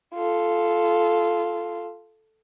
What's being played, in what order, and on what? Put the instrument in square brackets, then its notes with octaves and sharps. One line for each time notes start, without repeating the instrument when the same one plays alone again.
[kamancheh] F4 A4